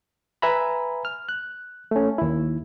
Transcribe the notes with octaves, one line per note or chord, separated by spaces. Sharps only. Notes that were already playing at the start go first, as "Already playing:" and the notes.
B4 E5 G#5 A#5 B5
F6
F#6
A3 C#4
D#2 E4